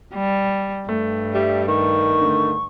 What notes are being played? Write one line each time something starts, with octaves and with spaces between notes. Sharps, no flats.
G3
G2 A3
G3 E5
D#3 C#6
D3 A3